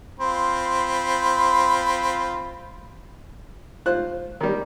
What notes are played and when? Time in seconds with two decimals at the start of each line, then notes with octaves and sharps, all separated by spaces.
0.19 C4 F4 B5
3.86 F4 C5 F#6
4.41 D#3 G3